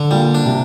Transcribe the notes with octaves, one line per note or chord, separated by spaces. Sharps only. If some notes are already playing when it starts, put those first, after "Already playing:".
Already playing: D3
A#2 G3
D4
C3